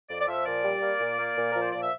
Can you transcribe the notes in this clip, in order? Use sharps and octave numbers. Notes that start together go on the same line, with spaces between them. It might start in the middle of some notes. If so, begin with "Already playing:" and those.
F2 D5
D5
F3 E5
A#2 D5
G3
A#3
A#2
A#3
A#2
F3 A#4
C5
A#2 D5
E5